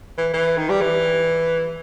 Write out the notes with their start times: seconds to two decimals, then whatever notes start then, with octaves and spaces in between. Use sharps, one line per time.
0.17 E3
0.33 E3
0.57 D#3
0.69 G3
0.81 E3